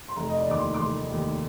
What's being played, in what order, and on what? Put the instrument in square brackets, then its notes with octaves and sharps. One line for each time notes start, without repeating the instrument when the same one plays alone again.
[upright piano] C6
F1 A#5
D#5
D5
D#2 D#3 D6
C6
D6
F1 C6
D#2 D#3